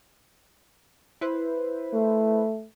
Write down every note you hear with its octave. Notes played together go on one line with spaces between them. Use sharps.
E4 B4 C5
A3